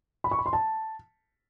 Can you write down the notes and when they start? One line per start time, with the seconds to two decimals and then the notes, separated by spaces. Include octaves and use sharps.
0.24 B5
0.31 C#6
0.39 B5
0.46 C6
0.53 A5